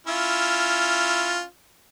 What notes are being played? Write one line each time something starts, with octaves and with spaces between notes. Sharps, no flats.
C#4 E4 F4